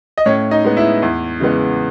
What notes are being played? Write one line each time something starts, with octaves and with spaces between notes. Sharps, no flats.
D#5
A2 C#4 C#5
D#4 D#5
G#3 B3
E4 E5
E2
C#3 E3 G#3 B3